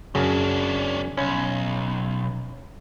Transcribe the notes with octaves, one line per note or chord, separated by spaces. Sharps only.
F#2 C#3 C#4 D4
B1 C#4